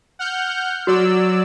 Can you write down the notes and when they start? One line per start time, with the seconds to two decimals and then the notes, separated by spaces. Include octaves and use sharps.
0.19 F#5 F6 G6
0.87 F#3 F#4 D5 E6